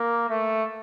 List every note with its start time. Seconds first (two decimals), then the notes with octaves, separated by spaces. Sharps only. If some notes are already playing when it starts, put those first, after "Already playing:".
Already playing: A#3
0.29 A3